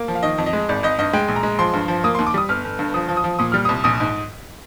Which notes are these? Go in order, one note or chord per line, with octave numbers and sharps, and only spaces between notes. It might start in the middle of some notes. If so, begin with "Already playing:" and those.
Already playing: A#3
F3
F5
D#3 D#5
F2
D#5
G#3
G#1 D5
G#1 D#5
G2 D#5
G#3 G5
A#1
A#5
G#3
F3 C6
G2
F3
A#3 D#6
D#2 C6
D6
G3 D#6
G1 F6
G1
G2
F3 D#6
F3
D#6
F3
A#2 D#6
G3 F6
C2 D#6
A#1 D#6
G#2